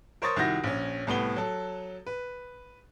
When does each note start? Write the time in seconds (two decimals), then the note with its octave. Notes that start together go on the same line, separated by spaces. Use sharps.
0.22 A#4 C5 C#5 C#6 D#6 A6
0.36 C2 D#3 E4 F#4 G6 A#6
0.64 A#1 C#4
1.07 C2 A2 B3 G7
1.36 F#3 A4
2.07 B4